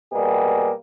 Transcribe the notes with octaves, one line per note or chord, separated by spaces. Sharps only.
B2 G3 A#3 G#4